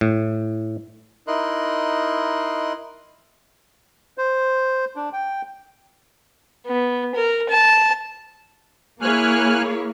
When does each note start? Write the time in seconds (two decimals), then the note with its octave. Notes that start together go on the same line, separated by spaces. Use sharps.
0.01 A2
1.27 D#4 E4 A#4 D#5 C6 F#6
4.18 C5
4.96 D4
5.13 G5
6.66 B3
7.15 A#4
7.49 A5
9.01 A#3 E4 G#4 C#5 G#5 F6 F#6